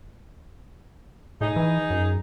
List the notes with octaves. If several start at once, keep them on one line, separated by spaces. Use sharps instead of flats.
A2 D#4 G#4
E3
F#2